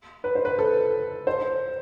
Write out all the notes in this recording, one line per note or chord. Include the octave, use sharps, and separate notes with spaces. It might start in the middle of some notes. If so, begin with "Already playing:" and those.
B4
C5
B4
A4
C5